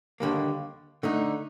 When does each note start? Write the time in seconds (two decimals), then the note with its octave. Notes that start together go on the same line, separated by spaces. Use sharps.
0.20 D#2 D3 G3 A#3
1.03 D3 A3 D#4